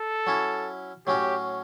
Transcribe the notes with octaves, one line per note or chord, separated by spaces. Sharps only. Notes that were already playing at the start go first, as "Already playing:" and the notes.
Already playing: A4
F#3 C#4 E4
A2 F#3 C#4 F#4 G4